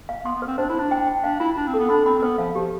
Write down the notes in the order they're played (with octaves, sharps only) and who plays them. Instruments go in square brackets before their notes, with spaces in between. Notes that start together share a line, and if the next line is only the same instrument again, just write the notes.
[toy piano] F5
[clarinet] B3 [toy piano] C6
[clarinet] B3
[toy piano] B4
[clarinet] C4
[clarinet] D4 [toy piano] C5
[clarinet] E4
[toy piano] C5
[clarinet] D4
[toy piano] G5
G5
[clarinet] D4 [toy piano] F5
[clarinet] E4 [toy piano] F4
[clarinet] D4 [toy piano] F4
[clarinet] C4
[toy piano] A4
[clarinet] B3
[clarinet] D4 [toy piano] B5
[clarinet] C4 [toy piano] B5
[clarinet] C4
[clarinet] B3 [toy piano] B4
[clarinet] F3 [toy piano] F5
[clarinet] F3 [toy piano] G4